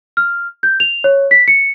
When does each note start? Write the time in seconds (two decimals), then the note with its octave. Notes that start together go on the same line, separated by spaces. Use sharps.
0.17 F6
0.63 G6
0.80 F7
1.04 C#5
1.31 B6
1.48 C#7